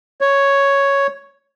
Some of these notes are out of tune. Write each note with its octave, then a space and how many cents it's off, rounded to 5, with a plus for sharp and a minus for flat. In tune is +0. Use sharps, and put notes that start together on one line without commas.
C#5 +0